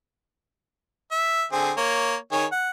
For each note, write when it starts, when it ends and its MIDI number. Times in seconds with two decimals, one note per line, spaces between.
1.11 1.44 76
1.52 1.71 50
1.52 1.71 60
1.52 1.71 68
1.77 2.15 58
1.77 2.15 73
2.32 2.45 51
2.32 2.45 68
2.32 2.45 73
2.52 2.70 78